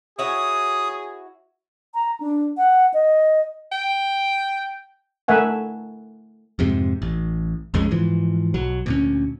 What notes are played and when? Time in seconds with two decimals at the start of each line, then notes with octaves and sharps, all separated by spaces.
0.19 E4 F#4 G#4 C#5 D#6
1.94 A#5
2.20 D4
2.57 F#5
2.94 D#5
3.72 G5
5.28 A3 A#4 E5 F#5 G#5
6.59 F2 G#2 C3
7.02 A1
7.74 A#1 F2 C#3 G#3
7.91 G#2 E3 F3
8.54 B1 F#3
8.86 D2 A#2 C#4